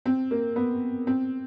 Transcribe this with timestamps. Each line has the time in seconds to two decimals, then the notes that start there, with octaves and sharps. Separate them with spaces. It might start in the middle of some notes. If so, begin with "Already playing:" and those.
0.06 C4
0.31 A#3
0.56 B3
1.07 C4